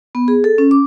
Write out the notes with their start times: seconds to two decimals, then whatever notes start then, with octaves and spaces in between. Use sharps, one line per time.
0.15 B3
0.28 G#4
0.44 A4
0.58 C#4
0.71 D6